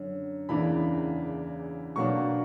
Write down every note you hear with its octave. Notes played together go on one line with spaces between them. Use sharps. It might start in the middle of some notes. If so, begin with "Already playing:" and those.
Already playing: F#2 D3
E2 C#3 E3 A#3 D4 B5
B2 F#3 A#3 D4 C#6